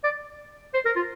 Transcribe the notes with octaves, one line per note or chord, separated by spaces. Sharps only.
D5
C5
A#4
F4